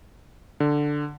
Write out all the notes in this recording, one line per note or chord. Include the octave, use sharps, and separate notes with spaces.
D3